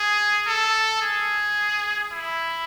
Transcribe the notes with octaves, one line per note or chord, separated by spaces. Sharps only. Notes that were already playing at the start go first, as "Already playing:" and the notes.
Already playing: G#4
A4
G#4
E4